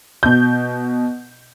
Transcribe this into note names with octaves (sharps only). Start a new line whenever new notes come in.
B2 G6